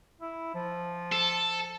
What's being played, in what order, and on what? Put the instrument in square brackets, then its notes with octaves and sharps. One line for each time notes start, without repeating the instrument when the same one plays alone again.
[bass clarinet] E4
F3
[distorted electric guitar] A4